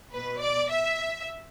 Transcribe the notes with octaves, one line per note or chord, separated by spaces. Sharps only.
B2 B4
D5
E5